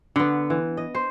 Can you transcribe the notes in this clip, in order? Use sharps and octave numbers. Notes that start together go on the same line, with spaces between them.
D3 B3
E3
D#5
C5